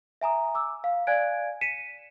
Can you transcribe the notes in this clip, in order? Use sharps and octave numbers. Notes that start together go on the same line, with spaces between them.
E5 G#5 A#5 D#6
D6 E6
F5
D5 F5 G#5 F#6 G#6 D7
B6 C#7 D#7 E7